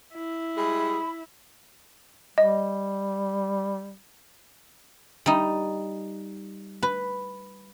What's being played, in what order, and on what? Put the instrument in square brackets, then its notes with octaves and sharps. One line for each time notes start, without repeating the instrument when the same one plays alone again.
[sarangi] E4
[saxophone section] G3 G#3 G#4 [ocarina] B5
[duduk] G3 [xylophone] D#5
[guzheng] G3 D#4
B4